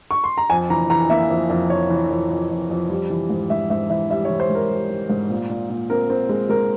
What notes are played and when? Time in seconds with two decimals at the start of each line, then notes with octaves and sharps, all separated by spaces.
0.11 C#6
0.24 C6
0.38 A#5
0.50 F2 G#5
0.70 E3 A#5
0.90 E3 A#5
1.10 A#3 E5
1.30 F2
1.50 F2
1.70 E3 C#5
1.90 E3
2.10 F2
2.30 F2
2.51 F2
2.70 F2
2.90 G3
3.10 E3
3.30 G#2
3.50 G#2 E5
3.70 G#2 E5
3.90 E3 E5
4.10 G3 E5
4.25 C#5
4.30 E3
4.40 C5
4.50 G#2
4.55 A#4
4.70 G3
4.90 G3
5.10 G#2
5.30 A#2
5.49 A#2
5.70 A#2
5.90 C4 A#4
6.10 C4
6.29 G#3
6.49 G#3 A#4